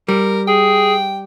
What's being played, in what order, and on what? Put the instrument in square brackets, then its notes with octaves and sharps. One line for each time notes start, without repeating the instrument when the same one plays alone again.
[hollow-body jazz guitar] G3 [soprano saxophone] A#4
[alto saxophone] G#4 [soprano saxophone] G5